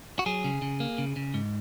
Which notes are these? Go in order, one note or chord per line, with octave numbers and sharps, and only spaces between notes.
F#4
F#3 G#4
C#3
C#3
A#3
C#3
C#3
G#2